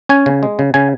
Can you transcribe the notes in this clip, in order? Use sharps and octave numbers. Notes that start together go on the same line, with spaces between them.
C#4 G#5
C#3
G#3
C#3
C#3 G#5